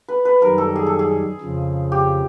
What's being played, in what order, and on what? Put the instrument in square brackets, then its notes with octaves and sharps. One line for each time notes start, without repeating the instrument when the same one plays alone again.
[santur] B4
B4
[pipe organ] F#2 D#3 G3 [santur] A#4
[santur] A4
G#4
A4
G#4
[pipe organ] F2 C#3 F3
[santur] G4